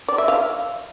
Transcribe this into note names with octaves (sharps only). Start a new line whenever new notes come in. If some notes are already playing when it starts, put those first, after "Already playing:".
D5
E5
F5